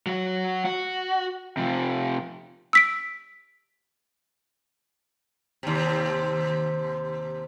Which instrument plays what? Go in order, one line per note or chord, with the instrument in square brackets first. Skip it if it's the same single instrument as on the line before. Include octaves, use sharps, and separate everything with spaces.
[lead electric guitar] F#3 F#4
F#4
C3 F3
[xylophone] E6 B6 D7
[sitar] D#2 C3